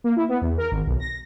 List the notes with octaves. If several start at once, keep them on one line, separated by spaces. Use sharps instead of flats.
A#3
E4
B3
E2
A#4
G#1
B1
A#6